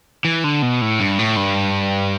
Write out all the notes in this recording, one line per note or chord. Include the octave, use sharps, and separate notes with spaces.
E3
D3
B2
A2
G2
A2
G2